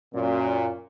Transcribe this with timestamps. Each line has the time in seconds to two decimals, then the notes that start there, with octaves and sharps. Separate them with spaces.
0.14 F#2 A#2